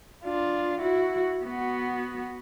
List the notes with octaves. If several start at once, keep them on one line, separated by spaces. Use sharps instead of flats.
D4 F4
E4 F#4
B3 F#4